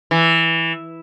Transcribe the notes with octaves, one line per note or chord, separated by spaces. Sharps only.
E3